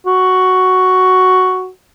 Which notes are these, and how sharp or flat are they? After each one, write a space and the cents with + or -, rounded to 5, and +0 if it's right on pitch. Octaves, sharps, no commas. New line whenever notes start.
F#4 +5